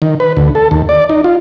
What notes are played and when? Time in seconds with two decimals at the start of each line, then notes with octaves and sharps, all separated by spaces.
0.02 D#3
0.20 B4
0.37 D2
0.55 A4
0.71 D#2
0.89 D5
1.09 D#4
1.24 F4